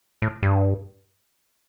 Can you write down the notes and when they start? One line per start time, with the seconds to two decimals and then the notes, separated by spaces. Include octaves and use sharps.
0.22 A2
0.43 G2